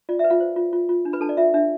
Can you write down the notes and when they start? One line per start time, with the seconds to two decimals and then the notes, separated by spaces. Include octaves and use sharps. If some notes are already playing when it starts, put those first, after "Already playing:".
0.09 F4 D5
0.19 E5
0.24 B4
0.30 F4 F5
0.40 C5
0.56 F4
0.73 F4
0.89 F4
1.05 D4
1.13 B4 B5
1.21 D4 A4 A5
1.29 D5
1.37 F4 E5
1.54 D4 E5